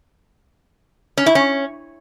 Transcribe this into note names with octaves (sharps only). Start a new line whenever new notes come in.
C#4
E4
C#4